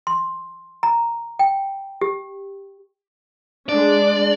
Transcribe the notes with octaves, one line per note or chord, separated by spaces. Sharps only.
C6
A#5
G5
G4
G#3 D4 D5